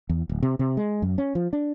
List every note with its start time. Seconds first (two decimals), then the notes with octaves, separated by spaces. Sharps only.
0.09 E2
0.29 D1
0.43 C3
0.59 C3
0.77 G#3
1.02 F#2
1.18 C#4
1.35 F3
1.53 D4